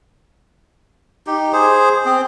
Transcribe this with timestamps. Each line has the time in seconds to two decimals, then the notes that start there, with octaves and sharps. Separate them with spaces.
1.27 D#4 G4
1.53 G#4 C5
2.06 C4